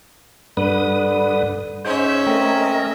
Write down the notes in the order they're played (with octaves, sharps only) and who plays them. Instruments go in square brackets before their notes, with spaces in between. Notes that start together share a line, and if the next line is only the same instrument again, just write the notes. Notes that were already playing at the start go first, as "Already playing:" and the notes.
[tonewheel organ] G2 B4 D#6 [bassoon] D3
[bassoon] G#2 [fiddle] C#4 E5 [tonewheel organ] C5
[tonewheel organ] A3 A#4 D#5 [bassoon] C4